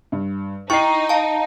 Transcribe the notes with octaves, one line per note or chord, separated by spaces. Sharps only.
G2
D#4 E4 G5 C#6 C7
F5 A5